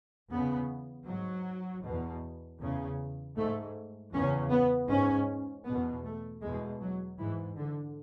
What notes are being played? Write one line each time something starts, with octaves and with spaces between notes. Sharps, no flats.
E2 C#3 B3
G#2 F#3
E2 B2
E2 C#3
G#2 A3
E2 C#3 C#4
B3
G#2 C#4
E2 B2 B3
A3
E2 B2 G#3
F#3
G#2 E3
D3